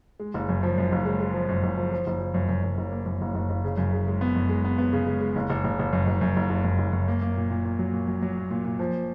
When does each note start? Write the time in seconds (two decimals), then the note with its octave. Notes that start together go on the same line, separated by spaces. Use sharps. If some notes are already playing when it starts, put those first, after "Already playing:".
0.20 G#3
0.34 F#1
0.49 F#2
0.63 F3
0.78 F#2
0.92 F#1
1.05 G#3
1.20 G#3
1.34 F3
1.49 F#2
1.63 F#1
1.78 F3
1.93 F3
2.07 F#1
2.20 F3
2.34 F#2
2.49 F#2
2.64 F#2
2.78 F#1
2.92 A#3
3.06 F#2
3.21 F#1
3.35 F#1
3.50 F#1
3.64 C#3
3.78 F#2
3.93 C#3
4.07 G#3
4.21 B3
4.36 F#2
4.49 G#3
4.65 B3
4.78 B3
4.93 C#3
5.07 G#3
5.21 G#3
5.36 F#1
5.49 F#1
5.64 F#1
5.79 F#1
5.93 F#2
6.07 F#1
6.21 F#2
6.36 F#1
6.50 F#1
6.65 F#2
6.79 F#1
6.93 F#2
7.08 A#3
7.22 A#3
7.37 A#2
7.50 A#2
7.65 A#2
7.79 F#3
7.93 A#2
8.08 F#3
8.22 F#3
8.37 A#3
8.51 A#2
8.65 A#2
8.79 F3